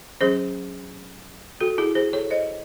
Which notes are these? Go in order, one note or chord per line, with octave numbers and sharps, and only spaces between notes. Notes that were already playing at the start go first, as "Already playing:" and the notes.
F#3 C#4 G#4 C5
F#4 A4
E4 G#4
G#4 C5
A4 C#5
C5 D#5